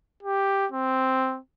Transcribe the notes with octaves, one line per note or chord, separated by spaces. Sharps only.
G4
C4